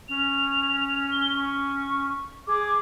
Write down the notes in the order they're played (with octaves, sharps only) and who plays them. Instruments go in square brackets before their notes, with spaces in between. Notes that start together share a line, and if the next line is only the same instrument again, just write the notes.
[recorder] C#4 [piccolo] F7
[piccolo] G7
C#6
[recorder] G#4 [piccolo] D6